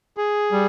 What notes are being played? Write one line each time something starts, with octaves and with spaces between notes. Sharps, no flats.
G#4
G3